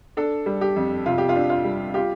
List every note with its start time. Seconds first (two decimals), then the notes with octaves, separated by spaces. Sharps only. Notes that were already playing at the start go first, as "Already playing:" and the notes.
0.17 D4 A4
0.46 G3
0.61 G4
0.76 F2
1.06 C3 F4
1.18 G4
1.29 F4
1.36 D4
1.50 F4
1.64 G3
1.94 F4 G4